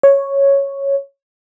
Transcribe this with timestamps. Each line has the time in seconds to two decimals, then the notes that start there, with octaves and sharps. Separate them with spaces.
0.03 C#5